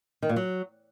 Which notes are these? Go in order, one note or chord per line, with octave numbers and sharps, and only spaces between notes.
D#3
A#2
F#3